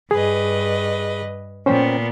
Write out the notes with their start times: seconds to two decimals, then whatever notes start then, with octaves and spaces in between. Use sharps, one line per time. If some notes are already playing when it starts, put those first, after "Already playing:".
0.11 G2 G#4 B4 D#5
1.66 A#2 B3 C#4 C5 G5